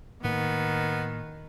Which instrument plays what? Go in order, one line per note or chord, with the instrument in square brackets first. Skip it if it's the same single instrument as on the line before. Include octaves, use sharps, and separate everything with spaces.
[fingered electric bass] A2 A#3 [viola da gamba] D#3 [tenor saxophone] B3